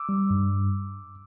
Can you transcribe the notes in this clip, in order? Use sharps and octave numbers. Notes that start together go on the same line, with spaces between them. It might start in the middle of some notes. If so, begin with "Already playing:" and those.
Already playing: D6 E6
G3
G2